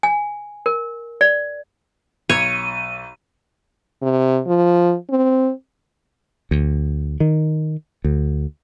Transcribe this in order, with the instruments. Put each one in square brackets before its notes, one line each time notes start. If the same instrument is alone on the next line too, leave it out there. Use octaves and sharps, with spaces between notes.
[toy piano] G#5
A#4
D5
[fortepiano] B1 [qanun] C#5 [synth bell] D#7
[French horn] C3
F3
C4
[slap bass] D2
D#3
D2